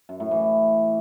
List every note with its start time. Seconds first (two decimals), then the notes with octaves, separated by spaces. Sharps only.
0.09 F#2
0.20 A2
0.31 E3